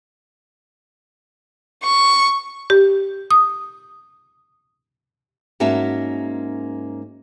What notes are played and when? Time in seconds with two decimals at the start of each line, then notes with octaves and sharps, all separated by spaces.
1.84 C#6
2.70 G4
3.31 D#6
5.60 G#2 A#3 C#4 F#4 E5 A5